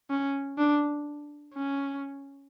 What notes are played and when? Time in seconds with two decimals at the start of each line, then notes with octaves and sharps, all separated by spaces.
0.10 C#4
0.58 D4
1.54 C#4